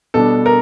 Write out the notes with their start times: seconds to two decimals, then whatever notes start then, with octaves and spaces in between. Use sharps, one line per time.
0.14 B2 G3 B3 D4 A4
0.46 A#4